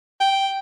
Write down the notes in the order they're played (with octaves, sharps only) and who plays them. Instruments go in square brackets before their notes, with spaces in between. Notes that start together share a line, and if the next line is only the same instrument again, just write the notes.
[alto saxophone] G5